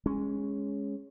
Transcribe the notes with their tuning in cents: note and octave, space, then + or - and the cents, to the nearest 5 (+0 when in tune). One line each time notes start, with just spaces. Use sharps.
G#3 -5 C#4 +0